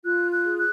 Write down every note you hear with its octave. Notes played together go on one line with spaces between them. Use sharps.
F4 F#6
F#6
G#4
F#6